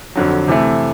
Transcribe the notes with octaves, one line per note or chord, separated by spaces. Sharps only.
F2 D3 F#3
C3 E3 A3